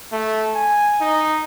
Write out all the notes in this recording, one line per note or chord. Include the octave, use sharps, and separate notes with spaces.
A3
G#5
D#4